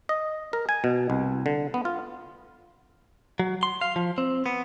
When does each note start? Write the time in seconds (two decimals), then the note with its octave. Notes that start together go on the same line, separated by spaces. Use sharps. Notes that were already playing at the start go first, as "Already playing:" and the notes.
0.09 D#5
0.53 A#4
0.69 G#5
0.84 B2
1.10 C2
1.46 D3
1.74 B3
1.85 F4
3.40 F#3
3.63 C6
3.81 F5
3.96 F3
4.18 C4
4.46 B3